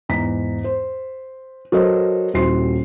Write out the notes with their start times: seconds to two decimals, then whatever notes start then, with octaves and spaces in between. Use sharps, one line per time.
0.09 E2 G#2 A#5 B6
0.64 C5
1.72 F#3 F#4 A4 A#4 C5 D#5
2.34 D#1 E4 F#4 C5 C6 C7